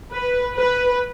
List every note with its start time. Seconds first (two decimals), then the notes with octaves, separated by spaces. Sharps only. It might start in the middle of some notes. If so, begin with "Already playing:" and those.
0.13 B4
0.57 B4